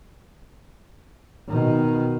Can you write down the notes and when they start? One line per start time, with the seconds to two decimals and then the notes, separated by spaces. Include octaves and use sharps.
1.48 B2 D#3